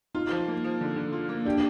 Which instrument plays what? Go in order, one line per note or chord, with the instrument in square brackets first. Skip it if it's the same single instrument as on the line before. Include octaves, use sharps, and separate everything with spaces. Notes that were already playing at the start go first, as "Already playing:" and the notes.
[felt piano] D#4 [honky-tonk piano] F4
[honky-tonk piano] F3
A#3
F3
D3
D3
F4
A#3
[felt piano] D4 [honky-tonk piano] G4